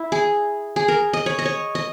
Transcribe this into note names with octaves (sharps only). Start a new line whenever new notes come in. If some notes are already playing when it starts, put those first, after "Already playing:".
Already playing: E4
G#4
G#4
A#4
D#5
C#5
D#5
C#5
D#5